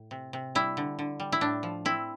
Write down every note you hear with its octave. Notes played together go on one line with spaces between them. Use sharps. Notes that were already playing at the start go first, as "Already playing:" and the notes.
Already playing: A2
C3
C3
G3 E4
D3
D3
G3
E4
A2 D4
F3
C4 E4